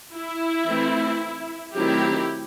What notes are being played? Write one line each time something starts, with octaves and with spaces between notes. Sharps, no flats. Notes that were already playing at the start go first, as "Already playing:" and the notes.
E4
E3 A3 C4
D#3 F#3 A3 C4 E4 G4